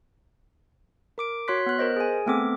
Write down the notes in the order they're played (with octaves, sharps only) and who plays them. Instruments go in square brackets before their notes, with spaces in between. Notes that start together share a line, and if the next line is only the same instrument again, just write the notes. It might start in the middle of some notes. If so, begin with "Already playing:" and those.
[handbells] A#4 D6 D7
F#4 C#5 C6 F#6 B6
B3 F#6
A#4 C5 D#5
G#4 G#5
A3 B3 C4 A4 D6